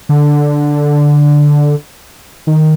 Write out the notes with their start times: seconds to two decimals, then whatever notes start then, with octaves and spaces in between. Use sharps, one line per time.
0.09 D3
2.47 D#3